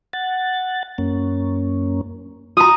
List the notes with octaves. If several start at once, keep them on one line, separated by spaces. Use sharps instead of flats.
F#5 A6
F#2 A#3 C#4
F4 F#4 A#5 D#6